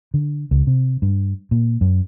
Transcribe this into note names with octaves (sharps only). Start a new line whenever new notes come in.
D3
C#2
C3
G2
A#2
F#2